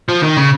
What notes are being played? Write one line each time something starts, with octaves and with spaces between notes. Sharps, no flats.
F3
D#3
C#3